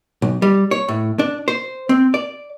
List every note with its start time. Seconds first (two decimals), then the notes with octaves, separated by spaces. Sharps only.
0.22 B1
0.42 G3
0.71 C#5
0.88 A2
1.19 D4
1.48 C5
1.89 C4
2.14 D5